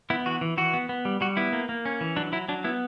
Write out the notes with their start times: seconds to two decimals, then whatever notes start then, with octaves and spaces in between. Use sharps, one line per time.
0.10 B3 E4
0.26 E3 F#4
0.41 E3
0.58 E3 F#4
0.74 B3
0.89 B3
1.05 G3
1.21 G3 F#4
1.37 B3 E4
1.53 A#3
1.69 A#3
1.85 C#4
2.01 E3
2.16 F#3 D4
2.32 F#3 E4
2.48 F#3 D4
2.64 B3 E4